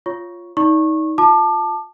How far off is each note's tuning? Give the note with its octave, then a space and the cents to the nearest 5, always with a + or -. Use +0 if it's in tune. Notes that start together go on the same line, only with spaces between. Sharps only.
F4 +0 C#5 +0 C#6 +0
D#4 +25 D5 -20 C#6 -20
F4 +15 A5 +0 D6 +35